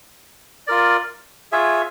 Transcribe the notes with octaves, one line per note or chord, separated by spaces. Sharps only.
F4 A#4 D5
F4 G#4 C#5 E5